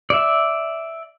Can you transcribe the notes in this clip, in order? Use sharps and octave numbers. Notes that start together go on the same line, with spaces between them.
D5 E5